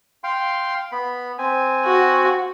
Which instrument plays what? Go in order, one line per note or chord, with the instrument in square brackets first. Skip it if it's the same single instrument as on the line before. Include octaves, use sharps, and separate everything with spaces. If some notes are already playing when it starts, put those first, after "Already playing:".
[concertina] F5 G5 C6
B3 B5
C4 G#5
[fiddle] F#4